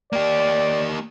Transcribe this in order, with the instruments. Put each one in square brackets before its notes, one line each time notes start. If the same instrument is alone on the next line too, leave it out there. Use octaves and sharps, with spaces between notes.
[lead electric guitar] A#3 G4 [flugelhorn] D5